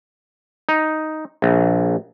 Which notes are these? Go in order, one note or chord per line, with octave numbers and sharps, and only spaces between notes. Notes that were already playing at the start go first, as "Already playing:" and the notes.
D#4
A#1